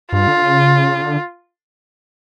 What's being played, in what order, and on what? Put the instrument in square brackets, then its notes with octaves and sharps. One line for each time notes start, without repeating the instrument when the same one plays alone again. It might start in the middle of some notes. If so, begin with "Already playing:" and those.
[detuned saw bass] G2 [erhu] F4
[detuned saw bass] D3
C#3
D3